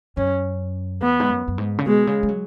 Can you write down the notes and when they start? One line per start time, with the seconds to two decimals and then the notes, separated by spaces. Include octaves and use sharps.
0.17 F#2 C#4
1.01 E2 B3
1.20 G#2
1.30 F#2
1.48 F#2
1.58 G#2
1.78 C#3
1.86 B2 G#3
2.07 C#3
2.23 G#3
2.29 F#3